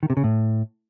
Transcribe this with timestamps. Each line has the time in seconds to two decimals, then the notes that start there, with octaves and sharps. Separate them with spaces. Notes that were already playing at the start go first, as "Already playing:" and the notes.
0.03 D#3
0.10 C3
0.17 C#3
0.24 A2